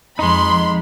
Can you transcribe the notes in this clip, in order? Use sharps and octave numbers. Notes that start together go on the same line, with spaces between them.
F2 G#3 D#4 B5 C6